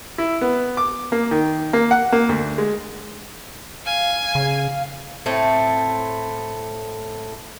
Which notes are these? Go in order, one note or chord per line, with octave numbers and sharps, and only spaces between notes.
E4
B3
D6
A#3
D#3
A#3
F#5
A#3
D2
G#3
F5 G#5
C#3
A2 A3 C4